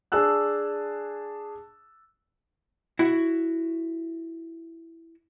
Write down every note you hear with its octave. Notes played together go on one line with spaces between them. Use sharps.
D4 G#4 A5 E6 F#6
E4 F#4